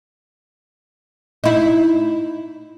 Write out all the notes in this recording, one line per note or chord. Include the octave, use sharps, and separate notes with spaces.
D#4 E4